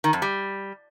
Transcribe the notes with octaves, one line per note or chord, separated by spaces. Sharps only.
D#3
F2
G3